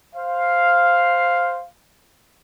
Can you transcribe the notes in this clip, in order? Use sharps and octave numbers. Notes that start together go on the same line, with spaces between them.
C5 F5